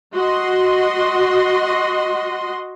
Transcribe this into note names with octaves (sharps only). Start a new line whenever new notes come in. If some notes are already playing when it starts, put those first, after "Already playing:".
F#4 D#5 C6